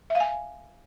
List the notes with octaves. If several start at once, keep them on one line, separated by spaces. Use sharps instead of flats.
E5
F5
G#5